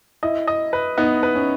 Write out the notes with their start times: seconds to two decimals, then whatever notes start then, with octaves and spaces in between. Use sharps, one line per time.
0.23 E4 D#5
0.48 D#5
0.73 B4
0.97 B3 D#4
1.23 B4
1.35 C#4